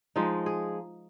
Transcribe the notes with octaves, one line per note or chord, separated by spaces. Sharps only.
F3 G#3 D#4
G#4